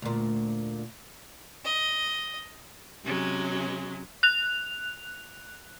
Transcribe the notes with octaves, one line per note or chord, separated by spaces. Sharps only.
D2 A#2
D#5
C3 F#3 G#3 C#4
F#6 F7